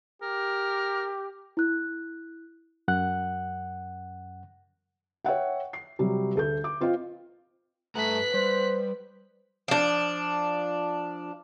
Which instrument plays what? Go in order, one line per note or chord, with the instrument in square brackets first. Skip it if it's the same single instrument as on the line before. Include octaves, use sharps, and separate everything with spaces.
[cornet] G4 [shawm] A#4
[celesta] E4 F#6
[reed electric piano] F#2 F#5 F#6
[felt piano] C#5 E5 F#5 G5
C7
C3 F#3 G3
D2 A4 G6
D6
C4 F4 D#5 F5 G5
[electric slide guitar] G2 A#5 [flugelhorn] A3 [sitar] B3 [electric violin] F#6 B6
[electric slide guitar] G3 [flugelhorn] C5
[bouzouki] F3 D4